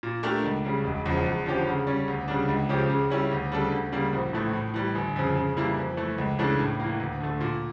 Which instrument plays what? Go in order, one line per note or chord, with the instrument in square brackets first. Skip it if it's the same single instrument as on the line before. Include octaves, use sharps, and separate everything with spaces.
[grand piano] A#2
A3 D4 G4 A#4
C#2
C#3 G3
E1
E2 C#3 F3
E2
D3 F3 C#4 G4
C#3
G3 C#4
D2
C#3 G3 D4
C#2
C#3 F3 C#4 G4
C#3
G3 C#4 E4
D2
C#3 G3 D4 A4
D2
C#3 G3 A#3
A#1
A2 E3 A3
A2
E3 G3
G1
F2 C#3
C#3
E3 G3 A#3 E4
F2
E3 A3
C#2
C#3 E3 A3 D4
A2
E3 A#3
D2
D3 A3
A#2